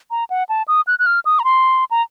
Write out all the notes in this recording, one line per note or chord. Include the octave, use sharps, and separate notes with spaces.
A#5
F#5
A5
D#6
F#6
F#6
F6
D#6
A#5
C6
A#5